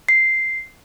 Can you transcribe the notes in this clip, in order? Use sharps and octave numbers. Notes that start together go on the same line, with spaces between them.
C7